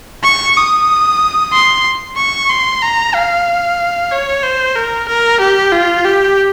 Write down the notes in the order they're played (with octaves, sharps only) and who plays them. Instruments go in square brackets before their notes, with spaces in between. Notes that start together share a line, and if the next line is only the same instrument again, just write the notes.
[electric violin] C#6
D#6
C6
C#6
C6
A#5
F5
C#5
C5
A#4
A#4
G4
F4
G4